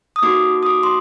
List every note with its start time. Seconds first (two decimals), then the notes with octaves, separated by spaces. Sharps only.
0.16 D#6
0.22 A#3 D#4 F#4 D6
0.63 D#6
0.66 D6
0.83 C6